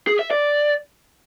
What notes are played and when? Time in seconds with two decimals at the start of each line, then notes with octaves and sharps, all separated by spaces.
0.07 G#4
0.19 E5
0.31 D5